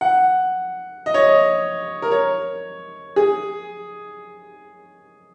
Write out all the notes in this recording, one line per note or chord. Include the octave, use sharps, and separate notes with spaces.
F#5
D#5
C#5
D#5
A#4
C#5
G#4